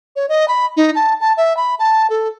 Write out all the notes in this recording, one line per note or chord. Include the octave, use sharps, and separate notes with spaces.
C#5
D#5
B5
D#4
A5
A5
E5
B5
A5
A4